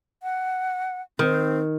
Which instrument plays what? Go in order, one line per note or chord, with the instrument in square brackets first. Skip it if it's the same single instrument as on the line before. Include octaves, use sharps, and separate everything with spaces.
[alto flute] F#5
[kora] D#3 [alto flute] C4